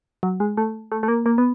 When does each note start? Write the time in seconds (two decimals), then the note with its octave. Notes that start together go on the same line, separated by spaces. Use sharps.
0.23 F#3
0.40 G#3
0.57 A3
0.92 A3
1.03 A3
1.08 A#3
1.26 A#3
1.38 B3